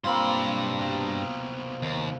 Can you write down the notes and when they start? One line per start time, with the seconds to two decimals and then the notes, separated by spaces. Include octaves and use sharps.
0.04 B1 G2 A#3 C4 F4 B5 C6
0.78 C2 B2
1.82 D#2